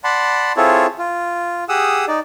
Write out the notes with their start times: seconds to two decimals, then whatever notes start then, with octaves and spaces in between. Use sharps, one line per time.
0.04 D5 F#5 A5 B5 C6
0.57 C4 E4 F4 G#4 A4 C#5
0.99 F4
1.69 G4 G#4 F#5 D#6 E6
2.08 D#4 D5